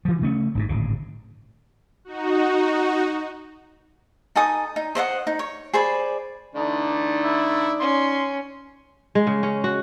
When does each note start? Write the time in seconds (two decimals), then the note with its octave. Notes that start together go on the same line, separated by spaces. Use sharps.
0.05 E3 F3
0.22 C#3 A3 C#4
0.55 G#1 D2 G#2
0.69 D1 G#1 C#3
2.05 D#4 F#4
4.36 D#4 A4 G#5 D#6
4.76 D#4
4.95 C5 D#5 E5 F#5
5.27 D#4
5.39 C#5
5.73 G#4 C5 D5 B5
6.55 D3 E3 A3 D#4 D5
7.24 E4
7.80 C#4 C6
9.15 G#3
9.27 C#3
9.43 C#4
9.64 F#4